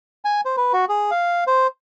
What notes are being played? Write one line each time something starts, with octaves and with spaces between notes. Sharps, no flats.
G#5
C5
B4
F#4
G#4
F5
C5